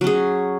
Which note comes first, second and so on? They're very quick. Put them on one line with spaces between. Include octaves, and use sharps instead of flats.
F#3 C#4 G#4